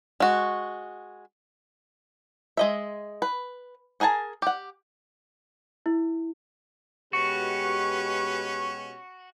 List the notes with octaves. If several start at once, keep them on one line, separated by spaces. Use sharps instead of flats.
G#3 F#4
G#3 D#5 E5
B4
D4 G#4 A#4 G#5 A5
G4 F#5
E4
B2 G#3 C#4 F#4 G4 B4 C#6